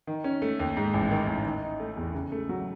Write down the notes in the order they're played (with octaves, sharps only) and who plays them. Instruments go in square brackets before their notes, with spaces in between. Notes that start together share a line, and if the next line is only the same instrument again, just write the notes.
[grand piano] D#3
C#4
A3
D#2
G#2
A1
D#3
A1
D#3
D#4
A3
E2
C#3
A3
F#3